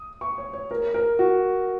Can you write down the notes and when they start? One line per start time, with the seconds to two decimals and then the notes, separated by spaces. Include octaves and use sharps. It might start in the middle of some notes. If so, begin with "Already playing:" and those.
Already playing: D#6
0.21 C#6
0.38 C#5
0.53 C#5
0.71 A#4
0.94 A#4
1.19 F#4